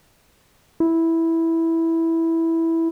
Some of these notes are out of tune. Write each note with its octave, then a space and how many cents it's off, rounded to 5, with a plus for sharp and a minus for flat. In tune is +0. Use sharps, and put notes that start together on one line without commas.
E4 -5